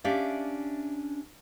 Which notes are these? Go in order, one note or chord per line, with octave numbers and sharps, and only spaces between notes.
C#4 D4 G4 D5 E5 F5